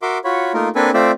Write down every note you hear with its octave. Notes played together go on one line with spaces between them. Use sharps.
F#4 A#4 E5 C6 D6
F4 F#4 C#5 B5
A3 A#3 D#4 F4 A#4
A#3 C4 D4 A4 B4 G#5
A3 C4 F4 C5 D5 E5